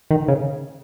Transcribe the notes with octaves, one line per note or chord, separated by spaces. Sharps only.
D#3
C#3